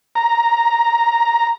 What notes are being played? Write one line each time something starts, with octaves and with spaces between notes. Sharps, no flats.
A#5